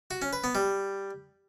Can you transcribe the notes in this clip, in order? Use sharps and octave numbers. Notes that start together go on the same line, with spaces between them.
F#4
C#4
B4
B3
G3